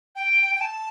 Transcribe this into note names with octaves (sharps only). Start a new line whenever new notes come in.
G5
G5
A5